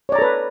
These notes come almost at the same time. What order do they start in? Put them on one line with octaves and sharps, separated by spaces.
C#5 D5 A#5 A4 B4